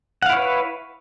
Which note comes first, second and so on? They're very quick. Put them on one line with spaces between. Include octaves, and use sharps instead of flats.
F#5 F5 E4 C#5 B4